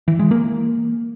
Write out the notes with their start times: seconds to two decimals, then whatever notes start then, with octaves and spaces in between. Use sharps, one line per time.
0.08 E3
0.19 G#3
0.31 A#3